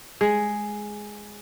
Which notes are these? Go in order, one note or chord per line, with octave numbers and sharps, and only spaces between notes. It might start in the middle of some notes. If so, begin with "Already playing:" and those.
G#3